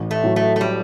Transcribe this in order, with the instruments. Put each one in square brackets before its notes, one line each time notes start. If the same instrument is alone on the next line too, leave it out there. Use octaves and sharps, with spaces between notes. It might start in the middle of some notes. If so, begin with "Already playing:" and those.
Already playing: [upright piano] A1
[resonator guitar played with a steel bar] A3
[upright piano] A2 F#3
[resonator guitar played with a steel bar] A3
A3
G3